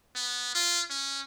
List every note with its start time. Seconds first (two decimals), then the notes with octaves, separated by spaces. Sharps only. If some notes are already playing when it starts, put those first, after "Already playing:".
0.15 B3
0.55 F4
0.90 C#4